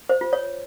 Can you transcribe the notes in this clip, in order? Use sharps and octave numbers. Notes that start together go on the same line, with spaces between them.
C5
F4
C#5